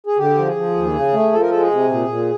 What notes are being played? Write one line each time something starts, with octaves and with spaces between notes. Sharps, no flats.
G#4
D3 G4
F3
G#4
F3
D#2
C#3
A3
F3 A4
A#4
G#3 A4
G#4
C3
A#2
A#2